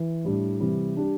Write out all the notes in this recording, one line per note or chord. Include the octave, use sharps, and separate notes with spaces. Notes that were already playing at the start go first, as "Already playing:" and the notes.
Already playing: E3
A2 G3 D4
C3 E3 G3
G3 D4 G4